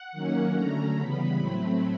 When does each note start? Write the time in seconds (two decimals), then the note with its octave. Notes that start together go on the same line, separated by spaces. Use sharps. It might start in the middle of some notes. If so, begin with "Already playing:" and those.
Already playing: F#5
0.12 D#3 F#3 A#3 C#4
0.54 D3 F#3 A3 C#4 A#5
0.96 C#3 E3 G3 B3 B5
1.38 A2 F#3 A3 C4